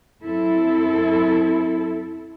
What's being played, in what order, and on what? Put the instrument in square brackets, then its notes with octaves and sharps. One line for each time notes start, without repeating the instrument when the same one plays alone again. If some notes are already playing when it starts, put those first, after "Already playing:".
[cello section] F#2 C4 E4 A4